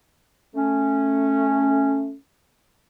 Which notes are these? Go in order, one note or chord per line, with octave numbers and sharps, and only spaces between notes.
A3 C#4